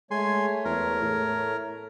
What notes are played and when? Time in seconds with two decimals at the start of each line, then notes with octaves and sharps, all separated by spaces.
0.11 G#3 A3 C#5 G#5 C6
0.65 E2 A#4
1.02 A2